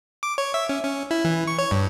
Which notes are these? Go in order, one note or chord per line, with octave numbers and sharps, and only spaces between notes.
D6
C#5
E5
C#4
C#4
E4
E3
C#6
C#5
G2